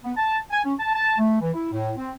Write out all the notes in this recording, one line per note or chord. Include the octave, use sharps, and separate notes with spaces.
B3
A5
G#5
C#4
A5
A5
A3
E3
E4
A2
C4